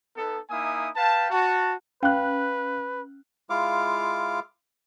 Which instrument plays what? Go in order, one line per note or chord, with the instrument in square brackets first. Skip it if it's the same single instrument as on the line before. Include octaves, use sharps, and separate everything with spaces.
[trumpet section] B3 D#4 A4
A#3 D#4 E4 E5 G#5 D#6
B4 F5 G5 A5
F#4 A5
[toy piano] C#4 [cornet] B4 [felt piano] F5 F#6
[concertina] G#3 E4 F4 F5 D6